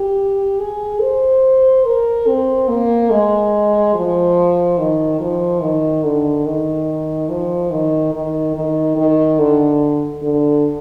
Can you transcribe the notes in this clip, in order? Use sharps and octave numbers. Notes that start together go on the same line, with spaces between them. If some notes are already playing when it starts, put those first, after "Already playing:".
Already playing: G4
G#4
C5
A#4
C4
A#3
G#3
F3
D#3
F3
D#3
D3
D#3
F3
D#3
D#3
D#3
D#3
D3
D3